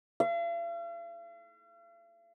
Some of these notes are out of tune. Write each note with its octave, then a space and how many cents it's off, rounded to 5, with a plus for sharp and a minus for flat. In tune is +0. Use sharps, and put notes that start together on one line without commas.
F5 -45